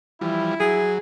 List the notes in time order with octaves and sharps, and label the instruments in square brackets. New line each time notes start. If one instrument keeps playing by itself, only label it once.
[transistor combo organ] E3 F3 G3 [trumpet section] E4
[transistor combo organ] F#3 [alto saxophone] G#4